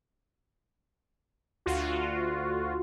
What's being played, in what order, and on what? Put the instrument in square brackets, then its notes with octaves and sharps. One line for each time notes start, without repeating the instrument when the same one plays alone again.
[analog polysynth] D2 F4 F#4